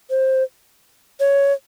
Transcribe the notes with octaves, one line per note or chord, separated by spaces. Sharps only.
C5
C#5